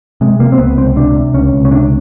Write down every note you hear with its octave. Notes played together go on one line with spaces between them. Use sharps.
C3 G#3
C3 A#3
C4
C#2 B3
C#2 C4
C3 D4
C3
C#2 C#4
C#2
C#4
C3 D4